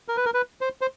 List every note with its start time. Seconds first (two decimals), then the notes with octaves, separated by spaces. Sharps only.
0.08 A#4
0.17 B4
0.26 A#4
0.34 B4
0.61 C5
0.81 C5